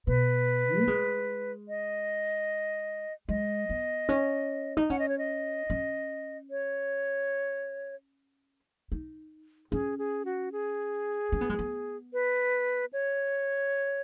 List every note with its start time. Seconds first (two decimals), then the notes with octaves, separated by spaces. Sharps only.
0.07 B2 B4
0.79 B3
0.87 G#3
1.68 D#5
3.29 G#3 D#5
3.69 B3
4.09 C#4
4.77 D#4
4.90 C#4 F#5
4.99 D#5
5.09 C#5
5.18 D#5
5.70 C#4
6.51 C#5
8.92 D#4
9.72 C#4 G#4
9.99 G#4
10.25 F#4
10.52 G#4
11.32 C#4
11.41 B3
11.50 G#3
11.59 B3
12.13 B4
12.93 C#5